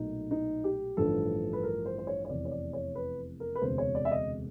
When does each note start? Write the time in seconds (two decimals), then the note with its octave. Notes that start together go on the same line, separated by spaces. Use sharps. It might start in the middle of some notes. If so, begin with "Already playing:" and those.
Already playing: B1 A#2 F#3 A3 D#4
0.31 D#4
0.64 G4
0.97 A1 G2 D3 F3 A4
1.53 B4
1.63 A#4
1.86 C5
1.98 C5
2.07 C#5
2.25 C#5
2.30 F1 E2 C3 D5
2.45 C#5
2.52 D5
2.73 C#5
2.95 B4
3.40 A#4
3.55 B4
3.62 E1 D2 C3 C5
3.78 C#5
3.95 D5
4.05 E5
4.12 D#5